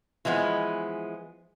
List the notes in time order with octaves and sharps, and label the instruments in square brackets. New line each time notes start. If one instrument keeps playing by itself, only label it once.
[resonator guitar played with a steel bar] E3 F3 G#3 B3